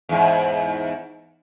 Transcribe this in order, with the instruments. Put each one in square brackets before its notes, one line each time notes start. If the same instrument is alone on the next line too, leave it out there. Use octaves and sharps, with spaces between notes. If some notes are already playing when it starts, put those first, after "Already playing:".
[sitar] E2 G#2